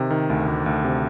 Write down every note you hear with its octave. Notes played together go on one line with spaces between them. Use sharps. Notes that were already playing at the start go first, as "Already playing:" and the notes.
Already playing: C3 D#3
D#3
D2
D2
D2
C3